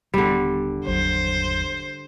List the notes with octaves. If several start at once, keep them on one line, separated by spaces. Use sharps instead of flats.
D#1 D3 G3 B3
G#1 E2 F#3 C5